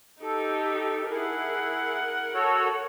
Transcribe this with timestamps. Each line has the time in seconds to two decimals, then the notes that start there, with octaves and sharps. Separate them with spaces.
0.22 D#4 G4 A4
1.10 E4 G#4 A#4 F#5
2.34 F#4 A4 C#5